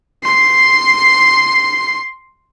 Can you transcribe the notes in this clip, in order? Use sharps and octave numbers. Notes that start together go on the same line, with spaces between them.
C6 C7